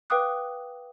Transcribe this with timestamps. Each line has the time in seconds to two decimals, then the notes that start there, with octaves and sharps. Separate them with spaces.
0.10 B4 F5 G5 D6 D#6 F#6